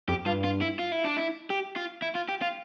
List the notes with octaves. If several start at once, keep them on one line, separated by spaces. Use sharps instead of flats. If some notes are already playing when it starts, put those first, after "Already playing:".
F2 G4
G2 F4
F4
E4
F4
E4
D4
E4
G4
F4
E4
F4
G4
F4